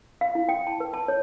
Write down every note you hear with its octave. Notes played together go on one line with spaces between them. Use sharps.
F5
E4
G5
A5
B4
A5
C#5